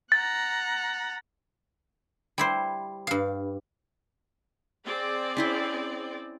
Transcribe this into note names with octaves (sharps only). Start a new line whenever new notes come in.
F#5 A#5 A6
G3 E4 C5
G2 F5
C4 G#4 D5
C#4 E4 C5